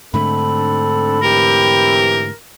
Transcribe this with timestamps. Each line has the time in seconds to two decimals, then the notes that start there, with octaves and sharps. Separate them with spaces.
0.14 G#2 D3 A3 C4 D4 A4 B5
1.22 E3 C4 G4 A#4